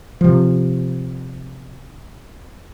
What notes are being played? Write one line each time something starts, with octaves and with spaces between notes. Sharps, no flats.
C3 F3